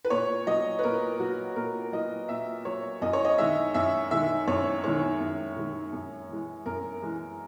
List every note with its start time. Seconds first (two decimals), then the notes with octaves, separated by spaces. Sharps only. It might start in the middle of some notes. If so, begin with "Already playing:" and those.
0.05 B4
0.10 A#2 C#5
0.47 F#3 D#5
0.79 B4
0.83 A#2 A#4
1.20 F#3 F#4
1.56 A#2 A#4
1.92 F#3 D#5
2.29 A#2 E5
2.65 F#3 C#5
3.02 F#2 D#5
3.13 C#5
3.25 D#5
3.38 D#3 G#3 E5
3.74 F#2 E5
4.11 D#3 G#3 E5
4.48 F#2 C#5
4.84 D#3 G#3 C#5
5.20 F#2
5.56 D#3 G#3
5.93 F#2
6.29 E3 G#3
6.66 F#2 A#4
7.02 E3 G#3